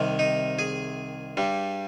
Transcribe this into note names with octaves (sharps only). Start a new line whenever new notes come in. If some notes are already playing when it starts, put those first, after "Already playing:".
Already playing: C2 C3 D#3
D#4
G#4
G2 G3